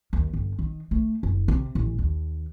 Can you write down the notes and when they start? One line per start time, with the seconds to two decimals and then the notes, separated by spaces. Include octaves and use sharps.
0.13 D#2
0.33 G1
0.59 D#3
0.91 A3
1.23 F#1
1.48 C3
1.75 A1
1.98 D#2